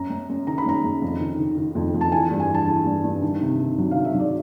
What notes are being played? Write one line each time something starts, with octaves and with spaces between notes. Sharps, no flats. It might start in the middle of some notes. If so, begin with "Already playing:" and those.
Already playing: F#2 A#5
F#2
F#2
D#3 A#5
B5
F#2 A#5
F#2
F2
D#3
D#3
D#3
F2
F2
A5
E3 G#5
G2
G#5
E3 A5
E3
G2
G2
D#3
C3
D#3
F#3
F5
D#3
E5
F#3
D5